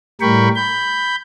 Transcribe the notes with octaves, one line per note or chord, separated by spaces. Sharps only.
A2 G3 A#4 G5 B5 C#6
B5 G6